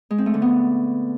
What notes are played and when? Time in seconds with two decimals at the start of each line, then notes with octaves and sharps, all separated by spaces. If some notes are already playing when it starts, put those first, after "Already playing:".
0.10 G#3
0.18 C4
0.26 A3
0.34 D3
0.42 B3